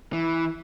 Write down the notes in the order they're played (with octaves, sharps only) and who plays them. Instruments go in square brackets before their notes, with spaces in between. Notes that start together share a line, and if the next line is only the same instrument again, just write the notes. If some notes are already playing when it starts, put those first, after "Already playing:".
[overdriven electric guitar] E3